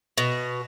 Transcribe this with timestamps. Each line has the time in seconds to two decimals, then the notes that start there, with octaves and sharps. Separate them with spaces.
0.18 B2